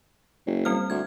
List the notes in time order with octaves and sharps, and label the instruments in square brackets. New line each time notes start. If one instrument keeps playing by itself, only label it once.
[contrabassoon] F#1
[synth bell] G3 C4 F6
[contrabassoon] D2 [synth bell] G#6